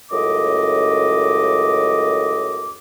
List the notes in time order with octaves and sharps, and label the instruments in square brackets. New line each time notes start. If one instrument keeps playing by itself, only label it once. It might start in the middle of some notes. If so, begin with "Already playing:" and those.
[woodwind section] C#2 F#2 A2 D#5 D6